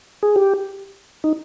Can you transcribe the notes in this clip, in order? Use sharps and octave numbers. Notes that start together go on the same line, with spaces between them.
G#4
G4
D#4